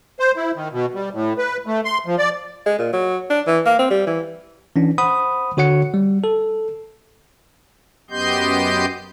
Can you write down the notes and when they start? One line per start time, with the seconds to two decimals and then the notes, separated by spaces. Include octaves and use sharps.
0.20 C5
0.37 E4
0.55 D#3
0.72 B2
0.95 G3
1.13 A2
1.38 B4
1.66 A3
1.85 C6
2.06 F3
2.18 D5
2.66 G#3
2.79 A#2
2.93 F#3
3.30 D4
3.47 E3
3.66 A#3
3.79 C4
3.90 G3
4.07 E3
4.76 E3 C#4 D4
4.98 C5 F#5 B5 D#6
5.57 D3 F#4 C#5 F#5 C#7
5.94 G3
6.24 A4
8.11 F#2 B3 G4 D#5 C6 G6